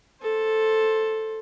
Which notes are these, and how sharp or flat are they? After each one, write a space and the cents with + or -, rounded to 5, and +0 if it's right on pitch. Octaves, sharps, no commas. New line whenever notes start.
A4 +0 C5 +15